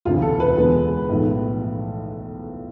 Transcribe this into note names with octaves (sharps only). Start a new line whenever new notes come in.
E1 D2 C3 E3 F4
A4
B4
E2 D3 G#3 B3
B1 A2 F3 A3